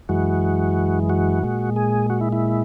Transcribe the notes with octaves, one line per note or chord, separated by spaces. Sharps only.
F#2 E3 G#3 F#4
F#4
A#2 G#3
G#4
F#4
E4
E4